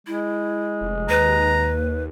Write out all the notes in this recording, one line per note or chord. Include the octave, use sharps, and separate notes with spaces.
G#3 E4
F1
D#2 B4 A#5